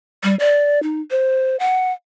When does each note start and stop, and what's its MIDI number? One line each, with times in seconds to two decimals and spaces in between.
0.24 0.35 55
0.39 0.81 74
0.83 1.01 63
1.11 1.56 72
1.60 1.92 78